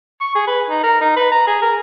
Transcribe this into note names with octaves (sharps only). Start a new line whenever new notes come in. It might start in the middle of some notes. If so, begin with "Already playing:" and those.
C#6
G#4
B4
D#4
A#4
D#4
B4
A#5
G#4
A#4